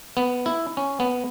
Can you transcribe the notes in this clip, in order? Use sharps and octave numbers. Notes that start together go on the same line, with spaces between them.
B3
E4
C#4
B3